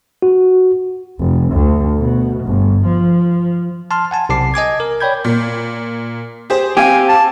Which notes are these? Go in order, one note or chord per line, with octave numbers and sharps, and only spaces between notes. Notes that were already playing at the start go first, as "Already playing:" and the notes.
F#4
F1
D2
B2
G1
F3
A5 C6 F6
F#5 G#5 A5
B1 C3 A5 D6 C7
D#5 G#5 D6 G#6
A#4
C#5 D5 G5 B5 G6 G#6
A#2
G4 G#4 C5
C4 G4 F5 G#5
A5